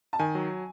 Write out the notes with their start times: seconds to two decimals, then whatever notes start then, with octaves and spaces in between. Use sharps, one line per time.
0.13 A5
0.19 D#3 G#5
0.35 F#3